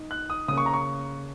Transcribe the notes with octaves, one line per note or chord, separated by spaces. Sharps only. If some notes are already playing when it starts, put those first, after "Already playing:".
Already playing: D#4
F#6
D#6
C#3 A#3 C#4 D#6
C#6
A#5
C#6